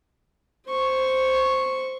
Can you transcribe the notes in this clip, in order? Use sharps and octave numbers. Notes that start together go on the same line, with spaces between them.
C5 C#6